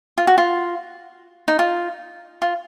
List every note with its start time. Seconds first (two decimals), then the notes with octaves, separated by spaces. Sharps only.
0.18 F4
0.27 F#4
0.38 F4
1.48 D#4
1.59 F4
2.42 F4